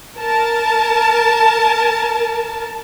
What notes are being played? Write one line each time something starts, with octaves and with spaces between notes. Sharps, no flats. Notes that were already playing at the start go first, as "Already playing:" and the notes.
A#4 A5